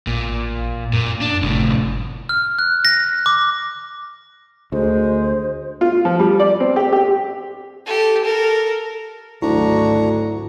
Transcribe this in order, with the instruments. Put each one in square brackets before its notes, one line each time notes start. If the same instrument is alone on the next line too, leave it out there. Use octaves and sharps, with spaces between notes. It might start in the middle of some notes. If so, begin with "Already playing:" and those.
[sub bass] A1 [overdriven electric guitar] A#2
[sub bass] F#2 [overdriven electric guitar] A#2
[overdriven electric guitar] D4
[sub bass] G1 [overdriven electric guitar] C2 A2
[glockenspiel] F6
F#6
A#6
D6
[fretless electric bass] D2 [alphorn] G#3 [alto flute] C5
[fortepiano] F4
F3
G3
D5
C4
G4
G4
[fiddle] G4 A4
A4 A#4
[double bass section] G#1 F#3 [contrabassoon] D2 [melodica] D4 A#5 C#6 [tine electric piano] E4